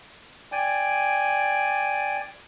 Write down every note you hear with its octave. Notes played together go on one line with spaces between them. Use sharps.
D5 G5 G#5